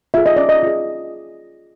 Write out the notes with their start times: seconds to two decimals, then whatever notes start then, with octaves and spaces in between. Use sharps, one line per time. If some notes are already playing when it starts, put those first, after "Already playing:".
0.14 F4 G#4 E5
0.26 D#5
0.36 C#4 D5
0.49 D#5
0.63 F4 G#4